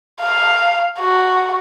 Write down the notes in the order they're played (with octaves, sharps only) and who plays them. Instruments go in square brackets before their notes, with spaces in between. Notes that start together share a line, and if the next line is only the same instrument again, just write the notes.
[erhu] F5
F#4